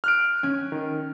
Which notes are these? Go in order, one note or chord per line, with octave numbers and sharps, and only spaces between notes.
F6 F#6 D7
C#4
D#3